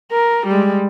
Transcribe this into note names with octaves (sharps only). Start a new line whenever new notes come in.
A#4
G3 G#3